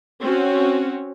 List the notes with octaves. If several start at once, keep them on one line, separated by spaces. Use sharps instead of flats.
C4 C#4 F#4